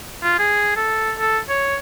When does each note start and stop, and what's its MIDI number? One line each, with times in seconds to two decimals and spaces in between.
0.23 0.35 65
0.39 0.73 68
0.76 1.13 69
1.19 1.39 69
1.49 1.77 73